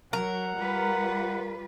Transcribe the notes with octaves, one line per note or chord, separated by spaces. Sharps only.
F#3 A#4 F#5
G3 F4 B4